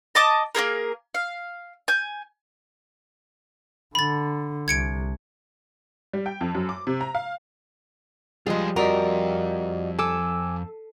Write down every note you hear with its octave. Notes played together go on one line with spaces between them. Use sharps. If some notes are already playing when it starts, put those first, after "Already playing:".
D#5 A5 D6 D#6
A#3 C#4 G#4 A#4
F5
G#5 G6
D3 B5 A6
C2 G#6 C#7 D7
G3
G5
F2
F#2
D6
C3
A#5
F5
F3 G3 G#3 F4 G#4 D#5
F2 F#4 A#4 D5 D#5
A4 G#5 D6 E6